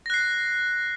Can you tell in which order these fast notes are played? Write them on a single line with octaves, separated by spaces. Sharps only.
A#6 F#6 C7